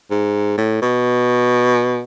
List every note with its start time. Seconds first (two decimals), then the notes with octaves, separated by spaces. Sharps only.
0.11 G#2
0.58 A2
0.82 B2